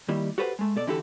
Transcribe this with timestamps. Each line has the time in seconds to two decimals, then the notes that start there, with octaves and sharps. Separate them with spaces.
0.09 D#3 G3 A#3 E4
0.38 F#4 G4 A4 B4 C5 F#5
0.59 G#3 A3
0.76 B2 A4 D5
0.87 D3 E3 E4 F#4 G4 A4